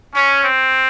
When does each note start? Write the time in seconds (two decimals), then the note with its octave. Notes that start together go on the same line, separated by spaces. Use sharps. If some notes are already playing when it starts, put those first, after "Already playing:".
0.14 C#4
0.44 C4